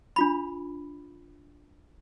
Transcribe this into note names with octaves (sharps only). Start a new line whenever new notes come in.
D4 F4 B5